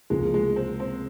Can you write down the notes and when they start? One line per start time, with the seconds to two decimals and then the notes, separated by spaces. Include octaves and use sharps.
0.10 C#2 C3 F3 G#3 A#3 F4
0.34 G#3
0.56 C4
0.80 C4